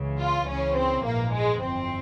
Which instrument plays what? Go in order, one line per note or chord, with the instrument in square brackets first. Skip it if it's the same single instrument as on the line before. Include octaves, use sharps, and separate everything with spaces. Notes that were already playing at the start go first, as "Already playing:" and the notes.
Already playing: [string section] C#2 C#3 E3
F4
C#2 C#3 E3 C#4
C4
A#1 G#2 E3 A#3
G#3
G1 F2 E3 C4